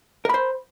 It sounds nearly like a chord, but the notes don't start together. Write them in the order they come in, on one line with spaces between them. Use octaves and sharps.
A#4 B5 C5